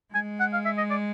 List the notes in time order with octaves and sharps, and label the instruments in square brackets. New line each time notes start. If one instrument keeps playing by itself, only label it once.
[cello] G#3 [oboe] G#5
[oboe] F#5
F5
E5
D#5
D5